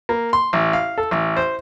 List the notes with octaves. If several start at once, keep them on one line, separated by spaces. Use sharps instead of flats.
A#3
C6
A1
F5
A4
A1
C5